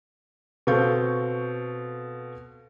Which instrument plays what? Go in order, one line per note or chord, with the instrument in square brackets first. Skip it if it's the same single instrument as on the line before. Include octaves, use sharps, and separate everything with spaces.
[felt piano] B2 C4 A4 F5 C#6 G6